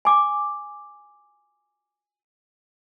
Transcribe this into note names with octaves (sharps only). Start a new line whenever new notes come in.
G#5 D6